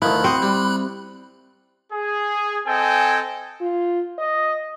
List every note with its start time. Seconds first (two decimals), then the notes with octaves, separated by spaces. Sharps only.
0.02 D2 D#3 F3 E4 B5 F#6
0.24 C4 F#4 D#6
0.42 G3
1.92 G#4
2.66 C4 A4 D#5 G5 G#5
3.61 F4
4.18 D#5